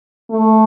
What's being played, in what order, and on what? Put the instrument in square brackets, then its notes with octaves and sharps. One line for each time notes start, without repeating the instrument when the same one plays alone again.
[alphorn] A3